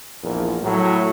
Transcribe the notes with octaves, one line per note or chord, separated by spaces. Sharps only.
A#1 E2 A#4
A2 F#3